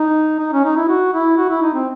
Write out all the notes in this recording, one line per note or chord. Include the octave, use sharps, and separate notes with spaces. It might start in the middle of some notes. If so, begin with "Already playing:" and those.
Already playing: D#4
D#4
C#4
D#4
E4
F#4
E4
F#4
E4
D#4
C4